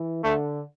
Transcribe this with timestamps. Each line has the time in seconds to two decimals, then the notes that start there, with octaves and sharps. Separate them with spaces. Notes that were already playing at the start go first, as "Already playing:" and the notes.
Already playing: E3
0.23 D3 A3